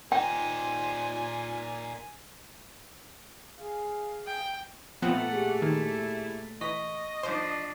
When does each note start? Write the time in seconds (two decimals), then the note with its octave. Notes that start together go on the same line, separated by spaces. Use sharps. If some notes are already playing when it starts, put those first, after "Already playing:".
0.12 A#2 D#4 C5 G5 G#5
3.59 G#4 F5
4.26 G5
5.02 A#2 F3 A3 B3 C4 F#5
5.32 G4 G#4
5.62 D#3 E4
6.61 E3 D#5 C#6 B6
7.23 F3 D4 C5